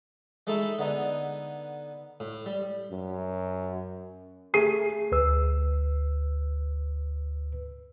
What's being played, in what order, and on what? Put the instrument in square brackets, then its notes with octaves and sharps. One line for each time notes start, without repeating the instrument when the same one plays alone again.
[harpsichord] G#3 A3 D#4 E4 A4
D3 B3 D#4
A2
G3
[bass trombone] F#2
[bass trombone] A3 [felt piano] G#4 C7 D#7
[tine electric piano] D2 B4 E6